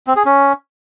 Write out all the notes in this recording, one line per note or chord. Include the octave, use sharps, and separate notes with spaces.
C4
G#4
C#4